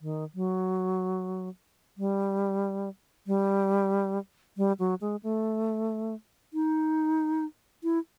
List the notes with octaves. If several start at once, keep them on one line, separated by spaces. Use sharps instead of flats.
D#3
F#3
G3
G3
G3
F#3
G#3
A3
D#4
E4